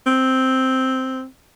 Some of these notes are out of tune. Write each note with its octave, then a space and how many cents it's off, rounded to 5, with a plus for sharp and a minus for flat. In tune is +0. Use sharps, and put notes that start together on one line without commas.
C4 +0